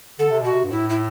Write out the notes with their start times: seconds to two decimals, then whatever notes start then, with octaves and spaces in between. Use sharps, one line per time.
0.19 D3 A4
0.29 C3
0.41 B2 F#4
0.52 C3
0.63 G2
0.71 A2 E4
0.89 E4